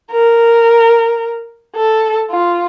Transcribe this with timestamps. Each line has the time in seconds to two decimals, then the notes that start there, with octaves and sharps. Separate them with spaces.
0.12 A#4
1.76 A4
2.31 F4